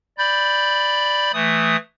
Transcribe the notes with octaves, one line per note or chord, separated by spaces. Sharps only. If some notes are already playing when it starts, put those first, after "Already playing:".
D5 B5 G6
E3 A3 D#6